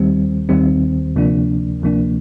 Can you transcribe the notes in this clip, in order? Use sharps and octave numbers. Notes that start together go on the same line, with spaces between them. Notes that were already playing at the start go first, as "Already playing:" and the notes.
Already playing: D#2 D#3 G3 C4
D#2 D#3 G3 C4
D2 C3 F3 A#3 D4
D2 C3 F3 A#3 D4